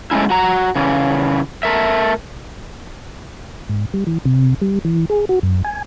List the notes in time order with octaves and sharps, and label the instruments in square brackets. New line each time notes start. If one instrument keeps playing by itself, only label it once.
[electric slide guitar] G#3 A3 C#4 E4
F#4 A#5
C#3 E3
A3 A#4 E5
[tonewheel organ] G#2
G3
E3
C3
G3
E3
G#4
F#4
F#2
G#5